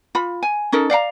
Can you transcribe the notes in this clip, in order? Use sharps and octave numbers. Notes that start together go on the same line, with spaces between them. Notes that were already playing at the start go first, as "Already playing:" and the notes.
F4 B5
G#5
C#4 D#4 A4 A#4
D5 F5 F#5 A#5